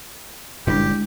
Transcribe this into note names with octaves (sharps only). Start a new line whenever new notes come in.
G1 F#2 A#2 G#3 D4 E4 G4